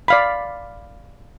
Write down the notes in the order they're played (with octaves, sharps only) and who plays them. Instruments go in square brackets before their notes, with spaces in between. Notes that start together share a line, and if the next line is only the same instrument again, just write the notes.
[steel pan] D5 F5 B5